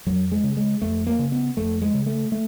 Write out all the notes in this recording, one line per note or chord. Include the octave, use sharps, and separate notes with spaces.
F2 F#3
G#3
C#3
G#3
F2 A3
A#3
C#3
B3
F2 A3
G#3
C#3
A3
A3